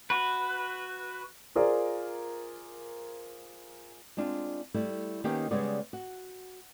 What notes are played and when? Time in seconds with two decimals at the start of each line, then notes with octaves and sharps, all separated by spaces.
0.10 F#4 B4
1.55 F4 G#4 A#4 C5 D5
4.17 G#3 C4 D4 F4
4.74 G3 A3 E4
5.24 D#3 A#3 B3 C#4 D#4 G4
5.51 C#3 G3 G#3 B3 D5
5.93 F#4